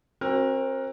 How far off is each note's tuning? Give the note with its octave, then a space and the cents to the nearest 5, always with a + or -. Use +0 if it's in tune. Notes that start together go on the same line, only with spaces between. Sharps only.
C4 +35 F#4 +0 A#4 +5